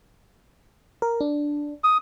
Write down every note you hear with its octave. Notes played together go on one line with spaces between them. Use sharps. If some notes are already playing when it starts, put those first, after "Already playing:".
A#4
D4
D#6